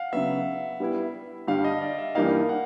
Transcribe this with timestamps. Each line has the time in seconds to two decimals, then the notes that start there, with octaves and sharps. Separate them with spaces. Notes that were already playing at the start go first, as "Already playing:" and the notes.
Already playing: F5 F#5
0.13 C#3 F#3 B3 E5
0.80 G3 B3 E4
1.47 G2 D3 G3 F5
1.64 D#5
1.81 D5
1.98 E5
2.15 G2 E3 G3 A#3 D#4 F5
2.49 F#5